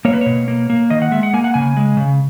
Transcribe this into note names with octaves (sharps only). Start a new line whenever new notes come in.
A#3 C#5
B4
C#5
B2
A#3
A#3
D#3 D#5
F#5
G#3 E5
F#5
A#3 G#5
F#5
C#3 G#5
G#3
C#3